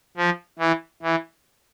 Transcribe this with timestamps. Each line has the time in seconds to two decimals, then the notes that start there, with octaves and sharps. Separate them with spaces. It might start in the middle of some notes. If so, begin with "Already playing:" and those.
0.17 F3
0.59 E3
1.02 E3